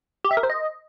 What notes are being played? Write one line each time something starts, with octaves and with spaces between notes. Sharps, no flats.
G4
E5
A#4
C5
D#5